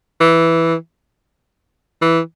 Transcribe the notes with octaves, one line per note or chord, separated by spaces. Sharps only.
E3
E3